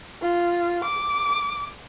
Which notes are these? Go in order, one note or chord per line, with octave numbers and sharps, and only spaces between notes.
F4
D6